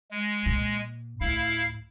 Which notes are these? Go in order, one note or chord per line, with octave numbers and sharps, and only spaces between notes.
G#3
A#2
D2 A2 E4 F5